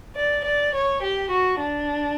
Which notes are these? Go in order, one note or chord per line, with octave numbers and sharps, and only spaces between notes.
D5
D5
C#5
G4
F#4
D4